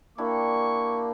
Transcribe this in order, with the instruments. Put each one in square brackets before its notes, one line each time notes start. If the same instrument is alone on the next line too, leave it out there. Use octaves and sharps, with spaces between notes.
[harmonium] A#3 [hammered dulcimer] D4 E4 G4 [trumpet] C#6